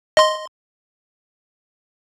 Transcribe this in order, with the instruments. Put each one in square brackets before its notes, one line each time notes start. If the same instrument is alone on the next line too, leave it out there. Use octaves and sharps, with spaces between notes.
[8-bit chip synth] D#5 C6